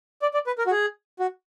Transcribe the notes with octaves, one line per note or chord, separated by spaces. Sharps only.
D5
D5
B4
A#4
F#4
G#4
F#4